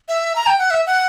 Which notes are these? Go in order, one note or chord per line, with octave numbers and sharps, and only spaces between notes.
E5
A#5
G5
F#5
E5
F#5